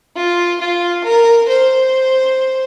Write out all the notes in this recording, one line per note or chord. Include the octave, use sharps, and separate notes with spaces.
F4
F4
A#4
C5